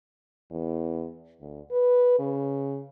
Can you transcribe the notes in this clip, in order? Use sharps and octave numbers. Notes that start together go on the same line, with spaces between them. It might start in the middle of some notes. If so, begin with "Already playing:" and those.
E2
D2
B4
C#3